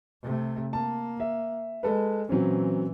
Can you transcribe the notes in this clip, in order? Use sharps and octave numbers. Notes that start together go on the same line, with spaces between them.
C3 A3
A#3 A5
E5
G#3 A4 B4
A#2 E3 F#3 C4 C#4